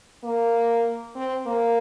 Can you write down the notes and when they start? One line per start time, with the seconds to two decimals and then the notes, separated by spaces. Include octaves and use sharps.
0.24 A#3
1.15 C4
1.46 A#3